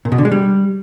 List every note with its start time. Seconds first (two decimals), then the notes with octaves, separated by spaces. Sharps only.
0.05 A#2
0.12 B2
0.18 D3
0.25 G#3
0.32 G3